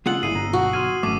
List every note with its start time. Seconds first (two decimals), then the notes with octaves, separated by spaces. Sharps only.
0.06 C#3 G#3 A#3 F4 F#5 D#6 E6 F#7
0.23 G1 G2 E4 G#4 D#6 C7 D#7
0.35 G1 A#5
0.53 B1 F#4
0.73 C6 F6 G#6 D#7
1.03 G#1 F#2 A3 D6 D#7